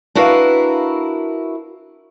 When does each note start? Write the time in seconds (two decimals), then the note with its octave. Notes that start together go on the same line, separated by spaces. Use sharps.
0.15 D4 E4 F#4 A#4 B4 F5